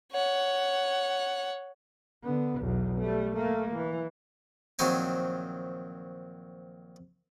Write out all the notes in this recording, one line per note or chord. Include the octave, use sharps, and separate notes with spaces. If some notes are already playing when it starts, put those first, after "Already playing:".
C#5 F#5
D3 B3
B1 E2
G3 A3
A3 A#3
E3
A#1 D#3 F#3 C4 C#5 G#5